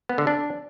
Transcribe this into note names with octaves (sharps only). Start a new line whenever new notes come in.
B3
D3
D4